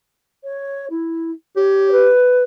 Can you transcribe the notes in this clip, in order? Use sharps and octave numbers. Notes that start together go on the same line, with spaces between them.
C#5
E4
G4 C#5
B4